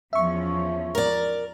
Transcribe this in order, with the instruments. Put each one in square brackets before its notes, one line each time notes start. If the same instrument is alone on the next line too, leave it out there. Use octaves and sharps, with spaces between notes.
[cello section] E2 F3 C#4 [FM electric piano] E5 C#6
[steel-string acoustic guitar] A#4 D5